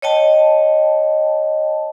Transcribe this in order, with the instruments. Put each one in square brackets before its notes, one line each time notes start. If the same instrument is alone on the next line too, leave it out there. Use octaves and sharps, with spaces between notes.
[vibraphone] C#5 D#5 G5 A5